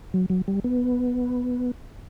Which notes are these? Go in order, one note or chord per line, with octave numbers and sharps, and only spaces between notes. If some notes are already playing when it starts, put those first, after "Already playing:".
F#3
F#3
G3
B3